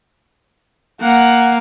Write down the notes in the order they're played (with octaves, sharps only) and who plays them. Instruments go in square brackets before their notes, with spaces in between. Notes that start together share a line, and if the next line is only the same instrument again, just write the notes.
[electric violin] A#3 [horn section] F#5